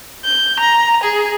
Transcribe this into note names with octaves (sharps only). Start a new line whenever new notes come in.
G6
A#5
G#4